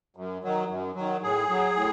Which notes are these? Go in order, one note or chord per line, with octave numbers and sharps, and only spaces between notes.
F#2
D#3 F#3
F#2
D#3 F#3
A2 G#4
F#3
A2